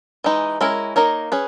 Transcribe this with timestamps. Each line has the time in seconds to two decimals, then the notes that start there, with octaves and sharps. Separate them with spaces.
0.24 E3 G#3 D#4
0.61 G#3 C#4 E4 A#4
0.96 A#3 D#4 A#4 C#5
1.32 C#4 G#4 B4